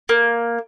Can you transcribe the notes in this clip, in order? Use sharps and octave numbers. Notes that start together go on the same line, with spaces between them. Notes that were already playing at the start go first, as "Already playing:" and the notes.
A#3